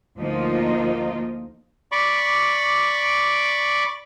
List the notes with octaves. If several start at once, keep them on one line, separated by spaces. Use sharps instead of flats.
D2 F3 A#3 D#4 F4
D5 B5 C#6 D6